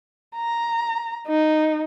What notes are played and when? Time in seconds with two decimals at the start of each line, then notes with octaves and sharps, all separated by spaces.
0.36 A#5
1.28 D#4